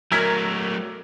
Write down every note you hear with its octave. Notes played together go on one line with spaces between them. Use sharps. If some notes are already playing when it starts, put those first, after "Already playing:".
F#3 A3 A#4 E6 G#6 B6